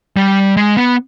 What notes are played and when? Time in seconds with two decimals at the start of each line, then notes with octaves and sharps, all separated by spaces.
0.17 G3
0.57 G#3
0.77 B3